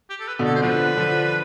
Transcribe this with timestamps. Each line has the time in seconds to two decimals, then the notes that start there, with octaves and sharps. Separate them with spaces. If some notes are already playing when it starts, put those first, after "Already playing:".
0.10 G4
0.20 A4
0.28 B4
0.39 B2 D3
0.45 A4
0.56 C5
0.62 D3 F3 B4
0.97 D3 F3